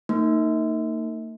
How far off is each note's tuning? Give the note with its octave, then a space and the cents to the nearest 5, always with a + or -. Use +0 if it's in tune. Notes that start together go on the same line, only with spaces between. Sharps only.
A#3 -40 D#4 +0